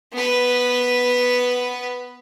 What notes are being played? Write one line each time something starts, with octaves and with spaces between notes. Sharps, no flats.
B3 B4